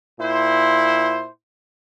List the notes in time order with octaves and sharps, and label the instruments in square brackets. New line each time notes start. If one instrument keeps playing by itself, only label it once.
[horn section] A#2 E4 C5